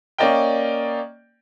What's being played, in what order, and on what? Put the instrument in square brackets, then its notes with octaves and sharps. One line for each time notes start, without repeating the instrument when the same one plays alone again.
[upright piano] A#3 C#4 D5 D#5 G5